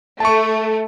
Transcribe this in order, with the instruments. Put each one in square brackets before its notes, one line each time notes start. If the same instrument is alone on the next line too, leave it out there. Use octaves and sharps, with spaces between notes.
[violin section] A3 [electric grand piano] A5 C#6